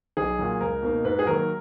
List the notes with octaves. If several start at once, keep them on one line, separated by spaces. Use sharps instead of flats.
B1 G#4
A#2 F#3
C#2 A#4
B2 A#3 D#4
G#2 B4
G#4
D#3 F#3 A#3 A#4